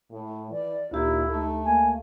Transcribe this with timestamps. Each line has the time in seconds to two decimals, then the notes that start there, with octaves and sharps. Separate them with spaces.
0.11 A2
0.51 E3 D5
0.91 D2 A#2 D#4 E4 G4
1.27 A3 D#4
1.65 A#3 G#5